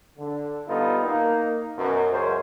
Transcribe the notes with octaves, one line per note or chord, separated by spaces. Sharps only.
D3
G3 B3 D#4 F4 A4
A#3 D#4
F#2 B2
C#2 F#2 C#4 C5